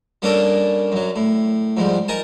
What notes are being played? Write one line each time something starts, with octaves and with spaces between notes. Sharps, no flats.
G3 A#3 C#4 D4 A4 A#4
F#2 F#3
A2
F2 G#2 G3
D#4 A#4 G#5 A5